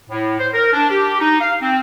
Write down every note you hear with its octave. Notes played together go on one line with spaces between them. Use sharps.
A2
C5
A#4
D4
G4
D#4
F5
C4